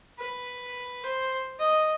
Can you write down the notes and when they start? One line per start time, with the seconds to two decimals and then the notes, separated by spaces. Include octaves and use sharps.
0.19 B4
1.03 C5
1.59 D#5